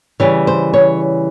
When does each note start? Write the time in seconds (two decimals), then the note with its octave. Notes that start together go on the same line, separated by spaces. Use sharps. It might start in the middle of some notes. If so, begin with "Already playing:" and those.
0.20 C#3 E3 G3 C#5
0.47 C5
0.74 C#5